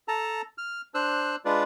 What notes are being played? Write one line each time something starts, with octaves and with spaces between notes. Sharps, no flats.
A4 A5 A#5
F6
D4 C5 E6 F#6
G#3 D4 F4 B4 D5